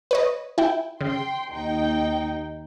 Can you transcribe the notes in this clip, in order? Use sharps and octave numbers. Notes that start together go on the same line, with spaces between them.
B4 C#5 D#5
E4 G5
C#3 G5 C6
D#2 D#4 G5